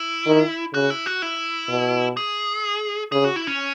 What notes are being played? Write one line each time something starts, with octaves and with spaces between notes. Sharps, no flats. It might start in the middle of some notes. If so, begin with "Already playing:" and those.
Already playing: E4
D#3
C#3 F#4
E4
F#4
E4
B2
G#4
C#3 G#4
F#4
E4
C#4